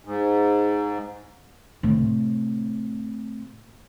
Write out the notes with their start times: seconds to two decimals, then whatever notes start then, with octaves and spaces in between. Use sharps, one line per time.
0.05 G#2
1.83 A2 C3